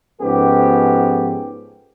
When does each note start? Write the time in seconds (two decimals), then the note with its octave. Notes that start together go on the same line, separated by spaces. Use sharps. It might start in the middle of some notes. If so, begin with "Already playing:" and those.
0.22 G#2 F3 B3 C#4 G4 A4